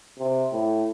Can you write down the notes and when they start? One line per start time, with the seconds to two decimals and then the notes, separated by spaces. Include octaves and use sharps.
0.19 C3
0.52 A2